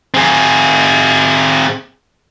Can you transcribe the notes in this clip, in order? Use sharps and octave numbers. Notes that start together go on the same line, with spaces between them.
C4 G#4